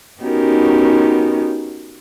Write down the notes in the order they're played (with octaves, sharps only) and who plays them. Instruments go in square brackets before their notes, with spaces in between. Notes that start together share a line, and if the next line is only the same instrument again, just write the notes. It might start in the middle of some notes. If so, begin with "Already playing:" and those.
[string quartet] B3 C#4 D#4 F#4 G4 A#4